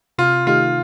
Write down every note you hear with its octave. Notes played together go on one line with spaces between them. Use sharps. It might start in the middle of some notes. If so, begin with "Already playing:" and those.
C3 F4
D#3 A3 D#4 F4 G4